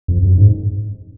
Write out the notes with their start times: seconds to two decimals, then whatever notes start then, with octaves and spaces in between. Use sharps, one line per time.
0.08 F2
0.23 F#2
0.37 G#2